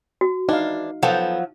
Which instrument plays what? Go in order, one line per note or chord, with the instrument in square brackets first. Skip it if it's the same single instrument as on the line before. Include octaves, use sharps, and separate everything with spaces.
[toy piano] F#4
[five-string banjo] E3 D4 [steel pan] D#4 F5
[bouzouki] F3 F#3 [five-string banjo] B3 A4 G5